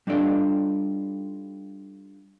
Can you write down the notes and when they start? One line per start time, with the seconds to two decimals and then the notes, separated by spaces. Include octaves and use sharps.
0.07 G3 D4 D#4 F4 A4 D5